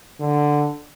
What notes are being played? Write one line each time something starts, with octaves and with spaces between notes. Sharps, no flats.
D3